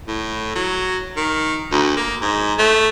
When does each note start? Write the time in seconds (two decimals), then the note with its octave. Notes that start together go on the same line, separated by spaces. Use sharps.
0.08 A2
0.55 F#3
1.17 D#3
1.72 D2
1.97 A#3
2.22 G#2
2.59 A3